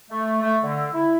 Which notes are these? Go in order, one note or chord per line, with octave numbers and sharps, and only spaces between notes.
A3
A3
D3
E4